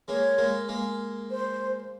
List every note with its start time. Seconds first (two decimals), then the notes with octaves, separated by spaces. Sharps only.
0.08 G#3 A#3 C#5
0.38 G#3 A#3
0.69 G#3 A#3
1.30 C5